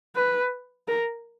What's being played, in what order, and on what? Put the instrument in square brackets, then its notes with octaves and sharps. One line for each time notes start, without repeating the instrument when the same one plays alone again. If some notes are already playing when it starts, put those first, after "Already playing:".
[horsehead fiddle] B4
A#4